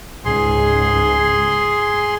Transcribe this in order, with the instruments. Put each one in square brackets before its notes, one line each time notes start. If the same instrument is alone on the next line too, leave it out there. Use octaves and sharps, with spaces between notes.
[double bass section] C#2 G#2 [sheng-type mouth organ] G#4 C6